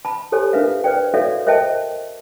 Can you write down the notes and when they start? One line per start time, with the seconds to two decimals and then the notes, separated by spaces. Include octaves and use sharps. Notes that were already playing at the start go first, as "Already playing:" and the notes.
0.05 A5 B5
0.32 G4 A4 C5 C#5 G#5
0.53 D4 F4 A#4 B4 E5 F5
0.84 B4 C5 D5 G5
1.14 F#4 A4 C#5 D5 E5 F5
1.46 A#4 C5 D#5 E5 G5 A5